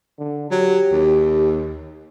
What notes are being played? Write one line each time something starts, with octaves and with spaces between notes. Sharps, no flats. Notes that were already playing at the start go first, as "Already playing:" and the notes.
D3
F#3 G4
D#2